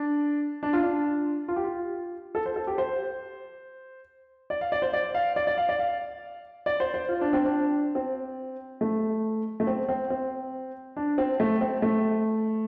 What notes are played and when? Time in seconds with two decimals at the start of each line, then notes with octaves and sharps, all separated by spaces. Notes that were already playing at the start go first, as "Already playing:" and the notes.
Already playing: D4
0.63 D4
0.73 F4
0.83 D4
1.48 F4
1.56 G4
1.64 F4
2.35 A4
2.46 C5
2.56 A4
2.67 G4
2.78 C5
4.50 D5
4.61 F5
4.72 D5
4.82 C5
4.93 D5
5.14 F5
5.36 D5
5.47 D5
5.58 F5
5.69 D5
5.79 F5
6.66 D5
6.80 C5
6.94 C5
7.09 F4
7.21 D4
7.33 C4
7.45 D4
7.95 C4
8.81 A3
9.60 A3
9.67 C4
9.89 C4
10.10 C4
10.96 D4
11.18 C4
11.40 A3
11.61 C4
11.82 A3